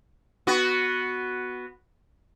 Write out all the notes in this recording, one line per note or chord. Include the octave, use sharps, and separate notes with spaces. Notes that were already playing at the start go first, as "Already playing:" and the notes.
B3 F#4